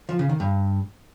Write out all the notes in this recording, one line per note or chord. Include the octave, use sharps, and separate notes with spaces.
F3
C#3
D#3
G2